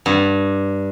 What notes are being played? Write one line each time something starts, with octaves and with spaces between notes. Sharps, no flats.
G2